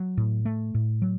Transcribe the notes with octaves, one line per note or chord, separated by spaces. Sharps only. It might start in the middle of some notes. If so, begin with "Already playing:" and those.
Already playing: F#3
A2
A3
A2
F#3